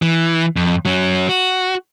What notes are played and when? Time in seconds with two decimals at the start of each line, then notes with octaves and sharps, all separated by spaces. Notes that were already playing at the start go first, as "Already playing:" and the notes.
0.02 E3
0.57 F2
0.85 F#3 C#4
1.29 F#4